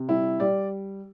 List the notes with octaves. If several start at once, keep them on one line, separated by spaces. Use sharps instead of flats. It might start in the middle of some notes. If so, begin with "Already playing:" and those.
Already playing: C3
G3 E4
G3 D5